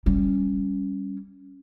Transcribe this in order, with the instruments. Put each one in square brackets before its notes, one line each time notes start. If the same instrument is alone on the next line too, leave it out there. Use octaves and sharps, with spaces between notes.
[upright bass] G3 C#4